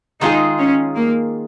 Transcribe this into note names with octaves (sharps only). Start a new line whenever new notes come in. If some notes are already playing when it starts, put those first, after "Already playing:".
D#3 G#3 D#4 F4 G#4
C#4
A#3